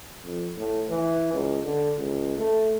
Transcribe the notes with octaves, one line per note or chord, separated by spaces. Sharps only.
F2
A2
E3
C#2
D3
C#2
A3